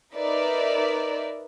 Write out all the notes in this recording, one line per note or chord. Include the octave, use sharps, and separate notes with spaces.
D#4 A#4 B4 D5 E5